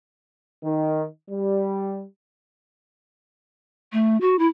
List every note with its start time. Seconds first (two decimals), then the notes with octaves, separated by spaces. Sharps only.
0.64 D#3
1.30 G3
3.93 A3
4.21 F#4
4.39 E4